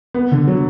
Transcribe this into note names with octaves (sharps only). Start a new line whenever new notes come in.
B3
D3
F#3